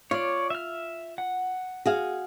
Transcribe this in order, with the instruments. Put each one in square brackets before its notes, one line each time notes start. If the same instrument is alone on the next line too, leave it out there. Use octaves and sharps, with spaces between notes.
[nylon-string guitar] F4 [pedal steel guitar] C#5 D5
[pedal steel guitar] E5 F6
F#5
[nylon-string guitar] F#4 G#4 F5